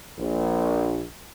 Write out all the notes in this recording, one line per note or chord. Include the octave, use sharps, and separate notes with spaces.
A#1